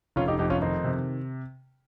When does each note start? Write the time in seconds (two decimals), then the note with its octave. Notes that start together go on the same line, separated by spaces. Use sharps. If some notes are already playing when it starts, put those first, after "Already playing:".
0.16 F1 C#4 F4
0.28 D#4 G4
0.39 F2 D#4 G4
0.50 C#4 F4
0.61 D#3 C4 D#4
0.84 C3